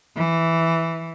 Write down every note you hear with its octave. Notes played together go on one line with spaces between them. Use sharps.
E3